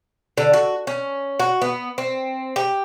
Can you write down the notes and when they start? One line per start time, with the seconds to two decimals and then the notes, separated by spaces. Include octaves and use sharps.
0.38 D3
0.53 F#4
0.87 C#4
1.39 F#4
1.62 B3
1.98 C4
2.56 G4